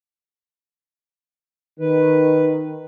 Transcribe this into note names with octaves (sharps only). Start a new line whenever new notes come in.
D#3 B4